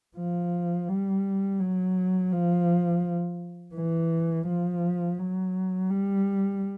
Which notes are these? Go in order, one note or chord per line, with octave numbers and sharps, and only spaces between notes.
F3
G3
F#3
F3
E3
F3
F#3
G3